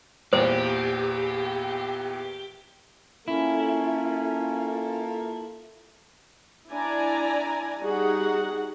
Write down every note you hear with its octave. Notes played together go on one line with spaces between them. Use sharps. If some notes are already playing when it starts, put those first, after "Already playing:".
E2 A#2 E3 G4 C5
A#3 C#4 E4 F4 A4
D4 E4 D5 G#5 A#5
G3 D#4 F#4 G#4 F#5